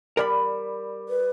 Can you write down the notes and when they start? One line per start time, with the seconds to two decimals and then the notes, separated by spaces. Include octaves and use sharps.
0.17 G3 A#4 D5 B5
1.09 B4